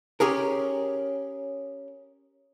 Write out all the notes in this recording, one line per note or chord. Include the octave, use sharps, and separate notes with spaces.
C#4 G4 G#4 A#4